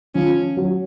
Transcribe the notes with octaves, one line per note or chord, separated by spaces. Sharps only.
F3 C#4
F#3